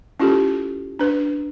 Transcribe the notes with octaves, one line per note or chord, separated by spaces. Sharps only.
C#4 E4 F4 G4 A4
D4 B4